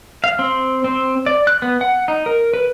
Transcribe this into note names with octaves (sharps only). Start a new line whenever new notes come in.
F5
C4
C4
D5
F#6
B3
F#5
D#4
A#4
B4